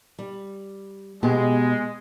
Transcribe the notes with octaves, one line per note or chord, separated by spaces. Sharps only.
G3
B2 G#3 B3 G4